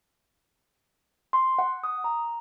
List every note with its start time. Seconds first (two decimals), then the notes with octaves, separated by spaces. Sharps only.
1.33 C6
1.59 F#5
1.84 D#6
2.04 A#5